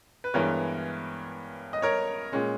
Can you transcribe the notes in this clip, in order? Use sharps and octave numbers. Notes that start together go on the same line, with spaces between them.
B4
G2 E3 G#3 B3 A#4 C#5
D#5
A#4 C#5
A#2 G#3 C#4